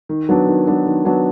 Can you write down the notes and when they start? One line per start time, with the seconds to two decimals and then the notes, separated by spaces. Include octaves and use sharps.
0.09 D#3
0.29 F#3 B3 D4
0.47 D#3
0.67 F#3 B3 D4
0.87 D#3
1.05 F#3 B3 D4